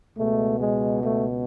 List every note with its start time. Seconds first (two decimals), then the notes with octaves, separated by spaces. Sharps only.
0.16 C#2 B2 G#3 A3
0.59 G#3
1.02 A3